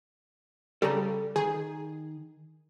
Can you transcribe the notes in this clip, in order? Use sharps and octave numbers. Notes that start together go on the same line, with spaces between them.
C#3 G3 A4 A#5
D#3 G#4